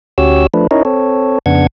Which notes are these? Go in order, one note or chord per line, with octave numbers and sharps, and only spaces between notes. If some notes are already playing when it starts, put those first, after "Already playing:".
D2 C#4 F#4 G4 C#5 E6
F3 A3 D4 B4
C#4 D#4 E4 A#4 C#5 D#5
C4 A4 C#5
F2 C#3 B3 D4 F#5 G#6